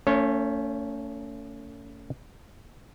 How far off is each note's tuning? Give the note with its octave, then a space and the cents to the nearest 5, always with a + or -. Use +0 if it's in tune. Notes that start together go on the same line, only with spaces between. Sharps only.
A3 +40 C#4 +30 C#5 -25